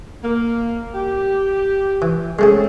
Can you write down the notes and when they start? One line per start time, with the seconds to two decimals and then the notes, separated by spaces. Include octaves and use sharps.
0.23 A#3
0.94 G4
2.02 E3
2.39 G#3 A3 C4 C#4 G#4